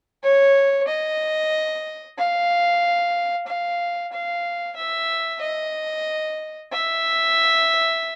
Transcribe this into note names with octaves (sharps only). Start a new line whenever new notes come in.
C#5
D#5
F5
F5
F5
E5
D#5
E5